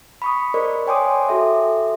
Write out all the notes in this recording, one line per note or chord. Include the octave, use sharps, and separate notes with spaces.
B5 C#6 D#6
A#4 C5 D5 D#5
C#5 G5 G#5 C6 D6 D#6
F#4 A4 E5